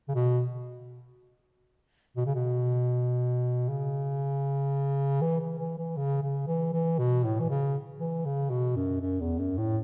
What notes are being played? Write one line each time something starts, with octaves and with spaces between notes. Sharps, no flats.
C#3
B2
B2
C#3
B2
C#3
E3
E3
E3
E3
C#3
C#3
E3
E3
B2
A2
E3
C#3
E3
C#3
B2
F#2
F#2
E2
F#2
A2